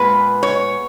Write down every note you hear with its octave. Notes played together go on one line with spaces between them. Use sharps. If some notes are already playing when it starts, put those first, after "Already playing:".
Already playing: A#2 G#3 B3 B4
C#5